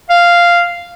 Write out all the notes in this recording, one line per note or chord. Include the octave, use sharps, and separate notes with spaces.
F5